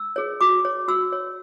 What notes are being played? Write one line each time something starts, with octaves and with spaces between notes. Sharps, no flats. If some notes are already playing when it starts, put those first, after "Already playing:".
Already playing: E6
G#4 C#5
F#4 D6
C#5
F#4 E6
C#5